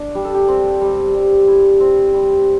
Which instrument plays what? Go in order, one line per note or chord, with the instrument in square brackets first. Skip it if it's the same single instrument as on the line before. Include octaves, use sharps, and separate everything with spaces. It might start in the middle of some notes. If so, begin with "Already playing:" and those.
Already playing: [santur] D4
G3 G4
A4
G4
C4
G3
G3
E4
C4
G3